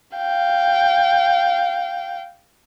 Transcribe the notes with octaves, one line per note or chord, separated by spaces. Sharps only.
F5 G5